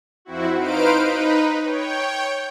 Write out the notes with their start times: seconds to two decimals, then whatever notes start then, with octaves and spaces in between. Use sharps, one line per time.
0.25 F2 C4 E4 F#4
0.55 D#4 B4 C5 F5 D7
1.01 D#4 B4
1.62 C#5 G5